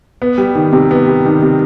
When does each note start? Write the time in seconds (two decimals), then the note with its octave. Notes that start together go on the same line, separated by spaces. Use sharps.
0.22 B3
0.38 G3
0.55 D#3
0.73 C3
0.91 B3
1.07 G3
1.25 D#3
1.42 C3